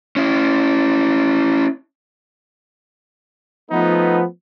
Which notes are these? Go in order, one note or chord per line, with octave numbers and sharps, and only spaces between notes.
C#4 E4
F3 A3 B3 D#4